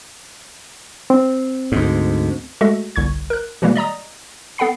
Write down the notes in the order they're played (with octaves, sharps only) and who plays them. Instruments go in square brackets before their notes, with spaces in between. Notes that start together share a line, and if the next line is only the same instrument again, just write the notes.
[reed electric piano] C4
[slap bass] D2 G#2
[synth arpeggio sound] G#3 A3 F#4 A4 E5 A#6
G1 C2 C#6 G#6
A#4 F#6
B2 E3 G3 G#3 A#3
D5 D#5 A#5 D#6
B3 A4 F#5 G5 B5 C7